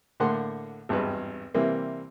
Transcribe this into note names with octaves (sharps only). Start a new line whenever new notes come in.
A2 D3 A#3 F#5 C6
G#1 E2 G2 B4
C3 E3 G3 A#3 C4